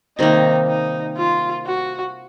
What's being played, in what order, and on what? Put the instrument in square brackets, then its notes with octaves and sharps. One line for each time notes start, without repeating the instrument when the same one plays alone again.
[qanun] C3 D#3 G3 A#3 [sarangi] D#4
[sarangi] D#4
F4
F#4